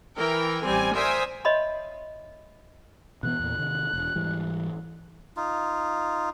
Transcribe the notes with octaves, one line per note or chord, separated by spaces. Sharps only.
E3 A#4 G5
A1 G3 C4 G#5
A#4 C5 D5 E5 G#5 D#6
C#5 D#5 E5 B5 C6
B2 E3 B3 F#6
E2 A#2
C3 D#3
E1
G#2 E3 G3
D#4 F4